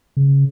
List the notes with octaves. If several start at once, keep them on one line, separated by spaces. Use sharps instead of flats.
C#3